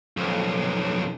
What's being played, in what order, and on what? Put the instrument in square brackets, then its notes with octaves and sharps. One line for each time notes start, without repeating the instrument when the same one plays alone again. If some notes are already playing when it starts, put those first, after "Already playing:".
[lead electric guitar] B1 F2